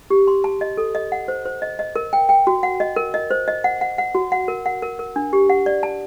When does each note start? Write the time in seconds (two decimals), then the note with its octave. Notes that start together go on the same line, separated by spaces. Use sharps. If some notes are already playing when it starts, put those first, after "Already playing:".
0.10 G4
0.28 C6
0.44 A5
0.61 D#5
0.77 A4
0.95 D#5
1.12 F#5
1.28 C5
1.45 C5
1.62 D#5
1.79 D#5
1.96 A#4
2.13 G5
2.29 G5
2.47 F#4
2.63 F#5
2.80 D#5
2.96 A#4
3.14 D#5
3.31 C5
3.48 D#5
3.64 F#5
3.81 F#5
3.98 F#5
4.15 F#4
4.32 F#5
4.48 A#4
4.66 F#5
4.82 A#4
4.99 A#4
5.16 D4
5.33 G4
5.50 F#5
5.66 D5
5.83 A5